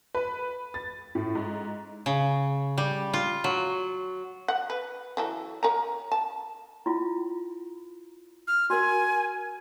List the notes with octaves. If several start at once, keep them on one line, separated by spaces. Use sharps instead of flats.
B4
A6
A2
G#2
C#3
G3
F4
F#3
F#5
B4
E3 F#3 A4
A#4 C#5 A#5
A5
E4 F4
F6
F#4 A#4 G#5